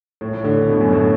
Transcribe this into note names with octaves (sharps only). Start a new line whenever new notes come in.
A2
A2
D3
D3
B2
F#2
A2